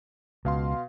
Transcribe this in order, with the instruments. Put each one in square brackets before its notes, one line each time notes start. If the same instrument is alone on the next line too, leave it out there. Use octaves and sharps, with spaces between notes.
[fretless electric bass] C#2 [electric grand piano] B2 F5 C6